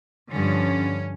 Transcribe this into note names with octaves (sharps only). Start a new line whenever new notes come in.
G2 D3 F3 C#4